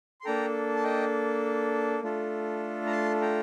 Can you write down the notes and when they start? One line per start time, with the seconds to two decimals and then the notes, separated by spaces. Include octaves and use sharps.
0.21 C6
0.25 A#3 D4 A4 G5 A#5
0.76 A5
0.84 D#5 G5
2.03 A3 D4 F4 A4
2.87 A#5
2.92 A5 C6
3.21 G5 A#5